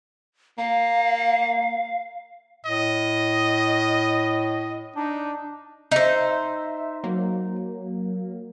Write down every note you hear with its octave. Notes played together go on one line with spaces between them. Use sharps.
A#3 F5
A2 D#5
D4 D#4
D#4 C5 E5
F#3 A#3